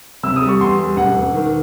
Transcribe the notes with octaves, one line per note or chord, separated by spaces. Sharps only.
C3 E6
D#6
G3
C#6
E2 C6
G3
E1 F#5
E1
D#3